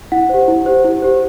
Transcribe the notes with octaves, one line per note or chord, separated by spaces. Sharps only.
E4 F#5
G4 C5
E4
G4 C5
E4
G4 C5